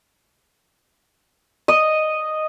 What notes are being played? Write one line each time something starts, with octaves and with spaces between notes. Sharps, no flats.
D#5